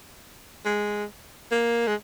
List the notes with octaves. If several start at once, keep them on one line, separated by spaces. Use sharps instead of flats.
G#3
A#3
G#3